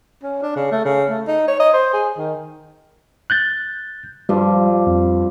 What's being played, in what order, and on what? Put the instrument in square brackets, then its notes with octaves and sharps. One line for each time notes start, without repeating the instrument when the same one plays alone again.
[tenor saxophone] C#4
D4
C#3
A3
C#3
A3
D#4
C#5
D#5
C5
G#4
D#3
[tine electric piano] F#6 G6 A6
[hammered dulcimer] G2 F3 [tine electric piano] G3
[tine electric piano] F2